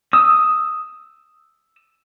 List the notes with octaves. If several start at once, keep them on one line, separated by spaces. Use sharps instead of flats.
D#6 E6